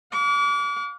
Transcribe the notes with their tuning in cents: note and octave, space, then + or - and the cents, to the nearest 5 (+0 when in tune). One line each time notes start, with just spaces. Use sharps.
F5 +40 D6 -35